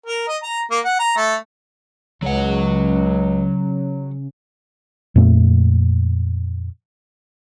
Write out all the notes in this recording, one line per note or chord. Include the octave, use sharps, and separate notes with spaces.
A#4
D#5
A#5
A#3
F#5
A#5
A3
C#2 C#3 F#3 F#5
F2 A#2 A3